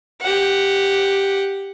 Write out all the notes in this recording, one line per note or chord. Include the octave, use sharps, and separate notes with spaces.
G4 F#5